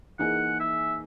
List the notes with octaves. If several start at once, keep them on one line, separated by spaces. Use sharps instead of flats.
E3 A#3 D#4 G#4 F#5
E5